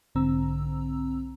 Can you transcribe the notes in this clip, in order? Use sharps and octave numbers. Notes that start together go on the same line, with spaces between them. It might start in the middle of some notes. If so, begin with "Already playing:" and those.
B1 G#2 D3 C4 A#5 E6